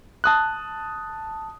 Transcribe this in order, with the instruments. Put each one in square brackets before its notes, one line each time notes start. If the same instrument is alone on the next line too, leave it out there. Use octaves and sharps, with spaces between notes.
[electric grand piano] A5 D#6 F#6